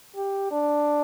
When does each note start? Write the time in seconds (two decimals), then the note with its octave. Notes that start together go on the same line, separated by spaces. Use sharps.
0.16 G4
0.51 D4